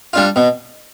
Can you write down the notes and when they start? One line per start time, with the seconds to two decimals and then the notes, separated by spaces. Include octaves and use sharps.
0.13 G3 D4 F4
0.36 B2